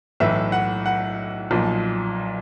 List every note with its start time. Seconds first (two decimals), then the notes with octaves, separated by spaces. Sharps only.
0.20 B1 A2 E3 E5
0.52 F#5
0.86 F#5
1.51 B1 A#2 F3